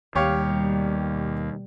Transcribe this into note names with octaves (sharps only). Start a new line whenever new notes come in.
D#2 B2 G3 G4 C#5 F5